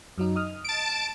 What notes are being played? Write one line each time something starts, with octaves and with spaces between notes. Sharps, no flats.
F#2 F#3 D#4
D#5 D#6 F6
A5 D7